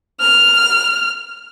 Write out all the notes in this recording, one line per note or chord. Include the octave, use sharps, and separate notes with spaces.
F6